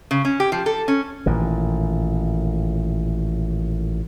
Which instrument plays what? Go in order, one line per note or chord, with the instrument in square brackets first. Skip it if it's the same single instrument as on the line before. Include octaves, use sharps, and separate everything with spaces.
[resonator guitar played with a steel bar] C#3
C#4
G4
F3
A4
C#4
[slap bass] A1 A#2 D#3